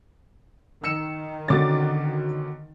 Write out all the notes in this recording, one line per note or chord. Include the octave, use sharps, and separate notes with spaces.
D#3 E6 C#7 E7
B2 D3 C#4 F#4 D6 A6